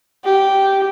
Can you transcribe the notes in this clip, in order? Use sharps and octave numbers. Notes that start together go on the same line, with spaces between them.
G4